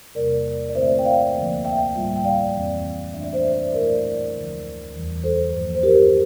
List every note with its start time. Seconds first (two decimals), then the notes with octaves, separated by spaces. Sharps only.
0.15 E2 C3 G3 A#3 A#4 D5
0.69 D5
0.75 G2 D3 A3 C4 E4 C5 E5
0.99 G5
1.05 D5 F5
1.35 D2 D3 F3 A#3
1.65 E5 G5
1.95 A2 G3 A#3 F4
2.16 G5
2.24 D5 F5
2.55 F2 E3 G3 C4
3.14 G2 E3 A3 D4 E5
3.24 D5
3.33 C5 E5
3.44 C5 E5
3.74 A#2 A3 E4 A#4 D5
4.33 D2 D3 F3
4.93 E2 E3 G3
5.24 A4 C5
5.53 G2 F3 A#3
5.75 C5
5.83 G4 A#4